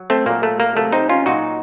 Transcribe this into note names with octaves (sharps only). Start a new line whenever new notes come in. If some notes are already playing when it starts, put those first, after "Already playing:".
Already playing: F#3
A3 C4
A#2 F#3 A#3
A3
A#3
C3 F#3 A3
C4 D#4
C#4 F4
A#2 F#3 D#4 F#4